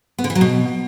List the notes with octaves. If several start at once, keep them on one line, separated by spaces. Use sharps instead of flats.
B3
D3
E3
F#3
B2